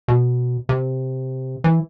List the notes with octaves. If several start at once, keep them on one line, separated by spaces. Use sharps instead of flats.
B2
C3
E3